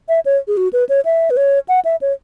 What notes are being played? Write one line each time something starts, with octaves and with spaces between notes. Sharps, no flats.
E5
C#5
G#4
F#4
B4
C#5
E5
B4
C#5
F#5
E5
C#5